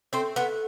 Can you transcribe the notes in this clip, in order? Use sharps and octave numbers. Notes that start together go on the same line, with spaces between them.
A3 C4 C5
B3 B4